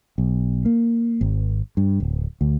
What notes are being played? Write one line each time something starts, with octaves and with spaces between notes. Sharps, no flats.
B1
A#3
G#1
G2
D1
D2